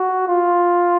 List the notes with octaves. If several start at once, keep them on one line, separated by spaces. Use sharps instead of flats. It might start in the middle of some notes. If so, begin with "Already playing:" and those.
Already playing: F#4
F4